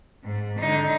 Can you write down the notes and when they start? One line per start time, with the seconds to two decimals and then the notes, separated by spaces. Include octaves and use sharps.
0.24 G#2
0.60 D3 D#4